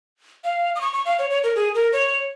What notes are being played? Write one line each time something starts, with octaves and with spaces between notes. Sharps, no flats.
F5
D#6
C#6
C#6
F5
C#5
C#5
A#4
G#4
A#4
C#5